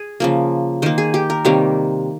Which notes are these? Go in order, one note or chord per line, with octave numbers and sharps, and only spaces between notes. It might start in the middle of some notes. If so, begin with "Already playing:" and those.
Already playing: G#4
C#3 F3 A#3
D#3 A#3 C5
G#4
G4
A#4
C3 D#3 G3 A#3 C#5